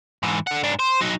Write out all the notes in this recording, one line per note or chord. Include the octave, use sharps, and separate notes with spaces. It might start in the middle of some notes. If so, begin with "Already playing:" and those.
G#2 E3
D3 F#5
G#2 D4
C5
F#3 D#4